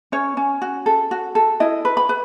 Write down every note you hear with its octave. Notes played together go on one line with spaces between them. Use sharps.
C#4 C#5
C#4
F#4
A4
F#4
A4
E4 D#5
B4
B5
B4